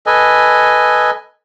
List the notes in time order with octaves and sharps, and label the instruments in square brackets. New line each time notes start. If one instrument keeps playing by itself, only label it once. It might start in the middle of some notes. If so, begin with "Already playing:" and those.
[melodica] A4 B4 D#5 G#5